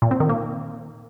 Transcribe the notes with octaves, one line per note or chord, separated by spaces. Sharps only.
A#2
C4
D#3
A#3